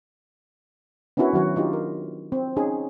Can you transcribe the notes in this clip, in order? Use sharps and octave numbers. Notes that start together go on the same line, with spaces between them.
B3 C#4 D4 E4 F#4 A#4
D#3 F#3 F#4 C#5
D4 D#4 F4 G4
A#4
C4
C#4 D#4 G#4